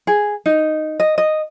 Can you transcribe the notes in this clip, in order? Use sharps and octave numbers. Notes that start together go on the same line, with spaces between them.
G#4
D#4
D#5
D#5